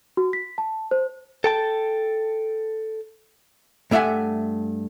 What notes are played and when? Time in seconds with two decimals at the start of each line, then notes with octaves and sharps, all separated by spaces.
0.17 F#4
0.33 B6
0.58 A5
0.91 C5
1.44 A4 G5 A5
3.91 G2 A3 E5 F#5 G#5